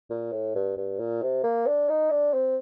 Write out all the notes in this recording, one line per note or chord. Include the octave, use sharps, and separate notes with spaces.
A#2
A2
G2
G2
A#2
C3
A#3
D4
D#4
D4
C4